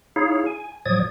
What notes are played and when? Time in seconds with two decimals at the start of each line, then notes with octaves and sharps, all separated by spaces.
0.16 D#4 E4 G#4 C#5 F5
0.46 G#5
0.86 A2 F3 F#3 D5 D#6 G#6